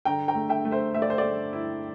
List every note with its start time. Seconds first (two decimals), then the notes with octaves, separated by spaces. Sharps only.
0.05 D3 G5 A#5
0.28 G5 A#5
0.35 A3
0.49 E5 G5
0.65 A3
0.71 C5 E5
0.94 A3 E5
1.02 D5
1.10 C5
1.18 A3 D5
1.53 E4